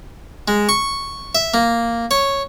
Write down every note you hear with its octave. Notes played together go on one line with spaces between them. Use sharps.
G#3
C#6
E5
A#3
C#5